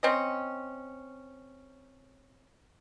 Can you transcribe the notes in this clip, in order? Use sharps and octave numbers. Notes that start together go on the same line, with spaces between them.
C4 C#4 D#5